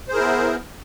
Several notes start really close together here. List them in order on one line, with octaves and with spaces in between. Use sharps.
C5 G#4 A#4 E4 B3